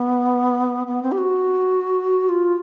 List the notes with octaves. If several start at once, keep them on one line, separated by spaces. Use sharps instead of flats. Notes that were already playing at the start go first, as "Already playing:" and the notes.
Already playing: B3
B3
C4
G4
F#4
F4